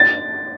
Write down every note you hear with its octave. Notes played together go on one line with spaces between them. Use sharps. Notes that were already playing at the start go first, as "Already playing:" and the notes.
Already playing: A6